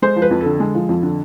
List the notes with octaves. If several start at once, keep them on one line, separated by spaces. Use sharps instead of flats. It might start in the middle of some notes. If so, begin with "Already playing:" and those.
G#3 C5
F3
B4
F2
A4
D3
G#3
F3
F2
D3